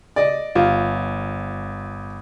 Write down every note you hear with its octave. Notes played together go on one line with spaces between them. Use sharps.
D5 D#5
G1 F4